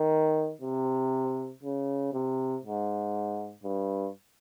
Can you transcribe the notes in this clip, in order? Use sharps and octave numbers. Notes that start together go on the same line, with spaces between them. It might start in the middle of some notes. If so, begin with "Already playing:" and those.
Already playing: D#3
C3
C#3
C3
G#2
G2